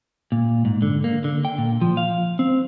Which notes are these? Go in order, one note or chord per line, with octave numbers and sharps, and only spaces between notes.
A#2
G#2
D3
A#3
D3
G5
A#2
F3
F5
C4